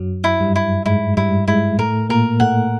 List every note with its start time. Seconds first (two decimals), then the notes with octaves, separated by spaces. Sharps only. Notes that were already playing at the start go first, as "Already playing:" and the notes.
Already playing: F#2 F#3
0.24 E4
0.40 G2 G3
0.56 E4
0.86 G#2 G#3 E4
1.17 G2 G3 E4
1.48 G#2 G#3 E4
1.78 A2 A3 A#4
2.09 A#2 A#3 A#4
2.40 A2 A3 F#5